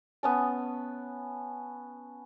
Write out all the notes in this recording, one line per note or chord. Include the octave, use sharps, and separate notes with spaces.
B3 C#4 A5